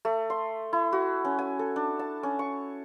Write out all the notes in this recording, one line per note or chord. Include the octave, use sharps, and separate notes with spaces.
A3
C6
E4
F#4
C#4
G#5
A4
D4
A5
C#4
C#6